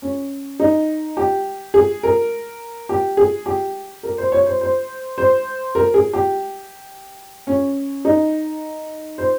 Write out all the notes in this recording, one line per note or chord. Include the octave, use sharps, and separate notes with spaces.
C#4
D#4
G4
G#4
A#4
G4
G#4
G4
A#4
C5
C#5
C5
C5
C5
A#4
G#4
G4
C#4
D#4
C5